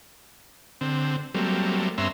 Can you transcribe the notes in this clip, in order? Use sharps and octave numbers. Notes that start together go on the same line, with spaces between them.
D3 C4
F#3 G3 A3 A#3 C4
G2 B3 C#4 E5 A#5 C6